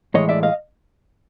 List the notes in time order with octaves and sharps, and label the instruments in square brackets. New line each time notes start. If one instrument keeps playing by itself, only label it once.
[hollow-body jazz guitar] A2 E3 G#3 C#5 D#5
D5 E5
D#5 F5